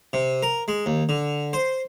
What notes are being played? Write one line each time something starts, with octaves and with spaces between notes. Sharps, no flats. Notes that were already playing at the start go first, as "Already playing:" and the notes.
C3
A#4
G#3
D#2
D3
C5